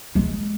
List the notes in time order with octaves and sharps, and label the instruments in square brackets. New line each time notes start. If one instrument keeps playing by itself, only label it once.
[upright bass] G#3